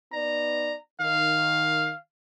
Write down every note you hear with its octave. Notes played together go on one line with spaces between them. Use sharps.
B3 D#4 D5 A#5
D#3 F5